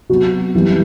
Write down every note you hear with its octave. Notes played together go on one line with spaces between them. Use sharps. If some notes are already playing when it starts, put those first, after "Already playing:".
C3 F#3 B3 F#4
F#2 E3 G3 B3